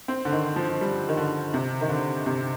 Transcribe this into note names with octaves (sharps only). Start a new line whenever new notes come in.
C4
D3
D#3
F3
G3
D#3
D3
C3
D#3
D3
C3